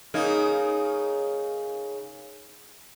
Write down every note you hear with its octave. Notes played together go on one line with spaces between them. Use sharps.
C#3 A#3 D#4